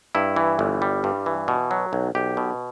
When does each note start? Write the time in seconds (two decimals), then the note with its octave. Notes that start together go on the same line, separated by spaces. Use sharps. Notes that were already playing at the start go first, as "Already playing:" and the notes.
0.15 G2 E4
0.36 E3
0.59 G1
0.82 G3
1.04 G2
1.26 E3
1.48 B2
1.71 F#3
1.93 B1
2.15 B1 G4
2.37 B2